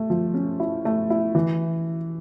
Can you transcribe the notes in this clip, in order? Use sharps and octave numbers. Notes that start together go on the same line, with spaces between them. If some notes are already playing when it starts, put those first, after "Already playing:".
Already playing: A3
F3
C#4
E4
A3
E4
E3